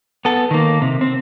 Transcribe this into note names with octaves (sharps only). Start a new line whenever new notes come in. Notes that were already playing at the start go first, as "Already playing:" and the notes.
B3 A4
D#3 A#3
C3
C4